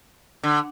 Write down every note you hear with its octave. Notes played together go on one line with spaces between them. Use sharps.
D3